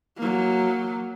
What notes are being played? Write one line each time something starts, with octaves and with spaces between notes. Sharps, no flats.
F#3 A#3